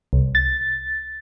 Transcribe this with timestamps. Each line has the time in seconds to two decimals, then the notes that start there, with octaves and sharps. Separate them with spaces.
0.13 C2
0.35 A6